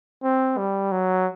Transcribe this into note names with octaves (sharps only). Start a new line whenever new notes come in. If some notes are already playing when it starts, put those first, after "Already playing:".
C4
G3
F#3